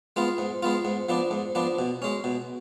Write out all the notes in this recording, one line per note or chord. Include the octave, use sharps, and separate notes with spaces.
G#3 B3 F4
G#2
G#3 B3 F4
G#2
F3 B3 D4
G#2
F3 B3 D4
B2
G#3 C#4
B2